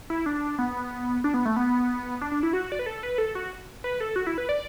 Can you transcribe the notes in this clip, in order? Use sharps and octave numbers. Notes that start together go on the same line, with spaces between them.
E4
D4
B3
D4
B3
A3
B3
D4
D4
E4
F#4
D5
B4
A4
B4
A4
F#4
B4
A4
F#4
E4
B4
D5